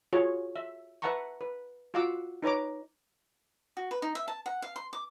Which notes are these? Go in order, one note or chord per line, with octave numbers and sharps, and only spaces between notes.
F4 F#4 G#4 C#5
E5
B4 E5 F#5 A5 A#5 C#6
B4
F4 F#4 F5 F#5 D6 E6
D#4 B4 C#5 A#5 D6
F#4
B4
D#4
E5
A5
F#5
F5
C6
D6